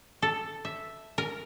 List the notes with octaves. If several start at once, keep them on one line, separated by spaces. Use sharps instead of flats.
A4
E5
A#4